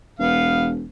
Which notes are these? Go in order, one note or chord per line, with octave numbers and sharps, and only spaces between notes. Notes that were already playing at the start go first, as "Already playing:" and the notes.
E1 B3 F5